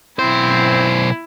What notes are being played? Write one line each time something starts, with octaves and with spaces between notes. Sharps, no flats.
B1 C4 E4 C5